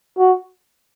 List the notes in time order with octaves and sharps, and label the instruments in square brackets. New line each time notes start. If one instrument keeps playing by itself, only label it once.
[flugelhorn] F#4